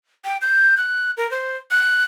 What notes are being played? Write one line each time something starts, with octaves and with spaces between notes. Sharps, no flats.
G5
G6
F#6
A#4
C5
F#6